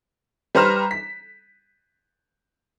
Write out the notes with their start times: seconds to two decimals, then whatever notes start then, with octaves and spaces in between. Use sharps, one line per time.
0.55 G3 B4 C5 A#5 F6 E7
0.91 B6